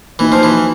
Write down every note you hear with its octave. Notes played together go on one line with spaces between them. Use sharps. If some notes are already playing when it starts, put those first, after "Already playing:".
E3 A#3 D#4 F#4
F3
E3